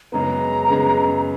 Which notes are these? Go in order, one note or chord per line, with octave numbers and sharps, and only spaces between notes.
F#2 C#3 G#3 B3 A#5
F#2 C#3 G#3 B3